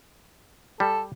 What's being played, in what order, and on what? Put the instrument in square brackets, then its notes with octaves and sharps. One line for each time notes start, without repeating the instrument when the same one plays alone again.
[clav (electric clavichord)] G3 [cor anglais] A4